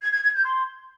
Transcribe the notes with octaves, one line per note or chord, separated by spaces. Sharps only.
G#6
G#6
G#6
G6
C6